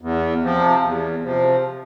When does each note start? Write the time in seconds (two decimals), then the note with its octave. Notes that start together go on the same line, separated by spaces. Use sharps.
0.01 E2
0.42 C3 F3
0.83 E2
1.24 C3 F3